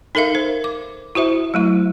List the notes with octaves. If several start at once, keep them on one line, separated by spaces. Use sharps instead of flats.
D#4 A4 A#4 E5 F5
C5
D6
E4 F#4 C5 E5
F#3 A3 E4